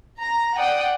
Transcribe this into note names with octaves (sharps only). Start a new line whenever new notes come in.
A#5
D5 F#5 G5 D#6